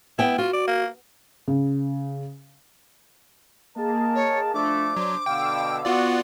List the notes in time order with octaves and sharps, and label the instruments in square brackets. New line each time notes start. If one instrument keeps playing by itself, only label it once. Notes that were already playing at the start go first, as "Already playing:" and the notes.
[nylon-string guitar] B3 G5 [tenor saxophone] E4
[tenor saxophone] F4 [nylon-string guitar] F#4
[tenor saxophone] D5
A#3
[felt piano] C#3
[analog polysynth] A#3 G#4 [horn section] A#4 D#5 A5
[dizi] C#5
[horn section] F3 A3 [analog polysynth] D4 [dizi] D6
[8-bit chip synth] F#3 [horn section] C5
[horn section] B2 D3 [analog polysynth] F5 E6 [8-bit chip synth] G5
[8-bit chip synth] B3 F4 D5 [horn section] F#4